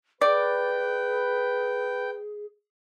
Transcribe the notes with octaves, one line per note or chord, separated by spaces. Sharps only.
G#4 B4 D5 G5